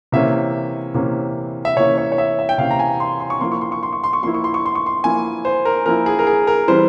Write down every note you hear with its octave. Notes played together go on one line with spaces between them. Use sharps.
C3 E3 A#3 C#4 E5
C3 E3 A#3 C#4
E5
C3 E3 A#3 C#4 C#5
C#5
C#5
E5
E5
G5
C3 E3 A#3 C#4 F5
A#5
G#5
C6
C6
C#6
F3 A#3 E4 C6
C#6
C6
C#6
C6
C#6
C6
C#6
F3 A#3 E4 C6
C#6
C6
C#6
C6
C#6
C6
F3 A#3 E4 G#5
C5
A#4
F3 A#3 E4 A#4
G#4
A#4
G#4
A#4
E3 G3 C4 C5